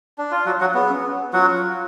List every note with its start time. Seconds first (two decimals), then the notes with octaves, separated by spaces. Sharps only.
0.18 D4
0.31 F4
0.46 F#3 F#4 C#5
0.60 F#3 F#4 C#5
0.74 B3 G#4
0.89 C#4
1.33 F#3 F4 F#4